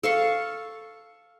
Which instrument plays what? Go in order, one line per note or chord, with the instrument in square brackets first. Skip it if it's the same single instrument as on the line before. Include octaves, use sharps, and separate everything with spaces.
[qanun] A4 F5 C#6